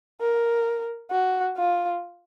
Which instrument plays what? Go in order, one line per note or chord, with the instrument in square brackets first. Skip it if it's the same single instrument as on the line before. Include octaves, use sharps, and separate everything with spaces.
[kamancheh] A#4
F#4
F4